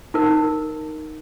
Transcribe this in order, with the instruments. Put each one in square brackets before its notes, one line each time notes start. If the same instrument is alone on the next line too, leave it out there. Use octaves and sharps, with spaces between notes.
[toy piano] D#4 A#4